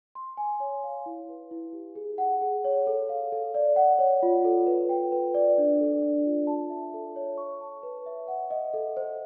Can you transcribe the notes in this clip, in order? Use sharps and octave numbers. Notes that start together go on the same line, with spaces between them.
C6
G#5
C#5
F5
E4
B4
E4
G4
G#4
F#5
G#4
C#5
A4
F5
A4
D5
F#5
C#5
F4
A4
B4
G5
B4
D5
D4
A4
D4
F4
A5
E5
A4
C#5
C#6
A5
B4
E5
F#5
D#5
A4
C5